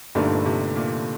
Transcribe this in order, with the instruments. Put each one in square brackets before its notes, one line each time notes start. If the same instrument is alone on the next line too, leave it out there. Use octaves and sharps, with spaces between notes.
[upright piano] G1 G2 D3 A3 D#4 [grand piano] A#2
[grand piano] C3
A#2